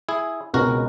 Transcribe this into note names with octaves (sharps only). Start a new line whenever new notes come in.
E4 G#4
C#2 B2 G#3 C#4 F#4 G#4 A#4